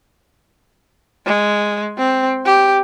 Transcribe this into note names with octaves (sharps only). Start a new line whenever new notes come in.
G#3
C4
G4